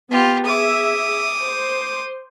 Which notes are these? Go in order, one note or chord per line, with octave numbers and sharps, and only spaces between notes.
B3 F4 G4
G#4 E5 D6 D#6
C5